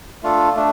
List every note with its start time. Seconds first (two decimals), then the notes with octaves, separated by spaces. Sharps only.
0.23 A3 D4 F4 A4
0.56 A3 D4